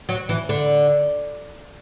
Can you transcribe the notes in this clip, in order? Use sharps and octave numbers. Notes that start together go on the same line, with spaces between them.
F#3
E3
D3